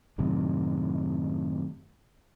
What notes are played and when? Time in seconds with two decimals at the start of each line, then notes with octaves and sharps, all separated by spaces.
0.18 F#2 A2 C3 D#3